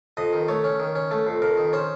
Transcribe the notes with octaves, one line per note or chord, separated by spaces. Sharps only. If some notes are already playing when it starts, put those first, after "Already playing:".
F2 D#5
D#3
A3 C#5
C#4
D#3
C#4
A3
F2
F2 A#4
D#3
C#4 C5